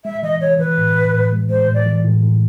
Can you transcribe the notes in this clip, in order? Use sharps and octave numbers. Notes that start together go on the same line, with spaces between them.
G#3 E5
E3 D#5
E3 C#5
E3 B4
A2
A2
A2
G#3
G#3 C5
A2
D5
E3
A2
A2